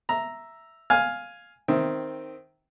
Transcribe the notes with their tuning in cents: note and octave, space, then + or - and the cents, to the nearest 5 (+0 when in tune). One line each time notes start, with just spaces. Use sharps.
E5 +0 A#5 +0
F5 +5 G#5 +0
D#3 +0 C4 +0 E5 -10